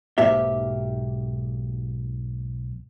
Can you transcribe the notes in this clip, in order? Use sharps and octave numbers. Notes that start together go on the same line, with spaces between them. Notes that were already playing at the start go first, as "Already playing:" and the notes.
B1 G#2 A#3 G4 E5